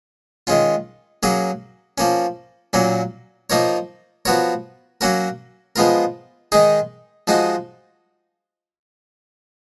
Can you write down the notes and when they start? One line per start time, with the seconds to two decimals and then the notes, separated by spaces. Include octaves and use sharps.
0.47 D#3 G#3 C#4 F4
1.23 F#3 A#3 C#4 G#4
1.98 F3 A#3 C#4
2.73 A#2 F#3 A#3 C#4
3.50 F3 A#3 D#4 A#4 C#5
4.25 F3 B3 F#4 A#4 C#5
5.01 F#3 A#3 C#4 F#4 A#4
5.76 F3 G#3 B3 F4 A#4
6.52 D#3 G#3 D#4 G#4
7.27 F3 G#3 D#4 F#4